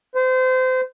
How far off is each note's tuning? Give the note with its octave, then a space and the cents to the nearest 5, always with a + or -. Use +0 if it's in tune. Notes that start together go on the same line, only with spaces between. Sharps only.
C5 -30